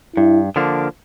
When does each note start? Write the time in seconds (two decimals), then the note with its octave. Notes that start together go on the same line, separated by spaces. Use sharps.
0.16 G2 E4
0.56 D3 F3 A#3 D4